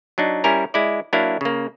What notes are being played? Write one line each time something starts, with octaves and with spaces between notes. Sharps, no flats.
F#3 D4 D#4
G3 C#4 E4 A#4 G#5 A#5
G#3 E4 D5
F#3 A#3 D4 E4 F5
C#3 A#3